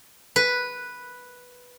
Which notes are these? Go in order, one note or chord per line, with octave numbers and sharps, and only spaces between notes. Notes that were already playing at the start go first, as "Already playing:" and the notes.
B4